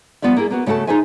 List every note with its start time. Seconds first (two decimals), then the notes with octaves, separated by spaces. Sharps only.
0.22 F3 G3 B3 F4 D5 E5
0.37 A#3 E4 G#4
0.50 A#3 B3 F#4
0.66 C#3 A3 F#4 A4 A5
0.87 D#4 F4 G#4 C5 E5 G#5